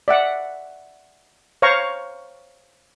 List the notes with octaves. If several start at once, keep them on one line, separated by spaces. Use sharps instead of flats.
D5 E5 F#5
C5 C#5 F5 A#5 C#6